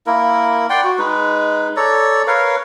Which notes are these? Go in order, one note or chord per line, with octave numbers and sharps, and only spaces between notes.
A#3 E4 A#4
D5 F#5 G5 C6
F#4
G#3 D#4 B4
A4 C#5 D5 A#5
A#4 B4 C#5 F5